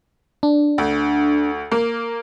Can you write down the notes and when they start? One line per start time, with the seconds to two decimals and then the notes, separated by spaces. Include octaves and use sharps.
0.43 D4
0.78 D2
1.72 A#3